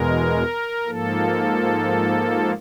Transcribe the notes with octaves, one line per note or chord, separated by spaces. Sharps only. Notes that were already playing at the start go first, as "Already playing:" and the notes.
Already playing: E2 B2 G#3 A#4
G#2 F3 A#3 A4